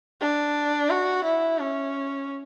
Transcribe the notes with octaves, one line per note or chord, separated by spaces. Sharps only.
D4
F#4
E4
C#4